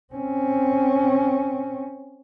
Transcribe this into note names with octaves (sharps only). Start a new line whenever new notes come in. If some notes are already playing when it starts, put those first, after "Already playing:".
C4 C#4